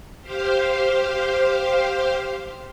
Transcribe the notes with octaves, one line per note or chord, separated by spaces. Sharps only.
G4 C5 F5